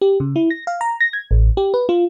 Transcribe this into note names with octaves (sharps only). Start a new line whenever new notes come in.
G4
C#3
E4
A#6
F5
A#5
A#6
G#6
A1
G4
B4
F4